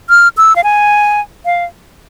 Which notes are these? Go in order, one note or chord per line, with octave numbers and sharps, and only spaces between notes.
F6
E6
F5
G#5
F5